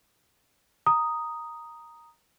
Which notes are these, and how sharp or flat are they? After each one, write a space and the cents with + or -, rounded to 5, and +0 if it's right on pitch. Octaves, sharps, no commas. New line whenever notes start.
A#5 +0 D#6 +0